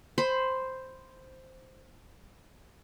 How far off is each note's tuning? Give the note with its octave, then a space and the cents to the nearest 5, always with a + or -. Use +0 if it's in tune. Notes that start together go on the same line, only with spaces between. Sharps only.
C5 +0 B5 +15